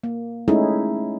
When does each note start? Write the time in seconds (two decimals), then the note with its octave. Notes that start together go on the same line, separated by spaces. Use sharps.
0.04 A#3
0.48 G#3 A3 C#4 D#4 E4 G#4